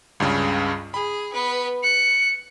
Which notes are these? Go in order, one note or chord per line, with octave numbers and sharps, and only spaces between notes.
C#2 G2 C#3
G#4 B5
B3 B4
F#6 C#7